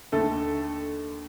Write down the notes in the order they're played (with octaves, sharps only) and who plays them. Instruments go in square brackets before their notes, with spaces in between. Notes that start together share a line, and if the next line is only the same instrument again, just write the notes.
[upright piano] D#2 D3 A3 A4